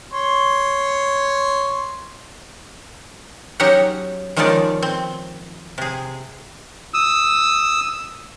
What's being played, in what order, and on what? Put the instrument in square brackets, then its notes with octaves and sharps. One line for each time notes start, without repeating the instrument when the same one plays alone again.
[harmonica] C#5 C6
[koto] F#3 C#4 D#4 G4 F#5
D#3 F3 G#3 C#4 D#4 D5
C4
C3 G#4
[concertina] D#6 E6